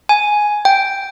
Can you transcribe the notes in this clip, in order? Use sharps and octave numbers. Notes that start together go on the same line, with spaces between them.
G#5
G5